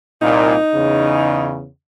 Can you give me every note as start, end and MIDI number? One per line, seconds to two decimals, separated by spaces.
0.22 0.55 36
0.22 0.55 46
0.22 1.55 63
0.74 1.66 40
0.74 1.66 49